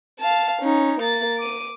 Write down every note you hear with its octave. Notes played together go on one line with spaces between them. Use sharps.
F5 A5
C#4 D#4
A#3 A6
D6 D#7